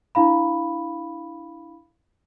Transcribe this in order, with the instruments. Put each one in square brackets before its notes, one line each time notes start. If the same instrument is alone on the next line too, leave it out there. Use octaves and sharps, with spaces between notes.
[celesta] D4 E4 F5 B5